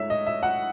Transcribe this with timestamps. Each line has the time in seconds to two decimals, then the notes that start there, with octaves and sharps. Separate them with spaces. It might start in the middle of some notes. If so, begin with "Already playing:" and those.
Already playing: G#2 A3 C#5 E5
0.10 D#5
0.26 E5
0.43 F#5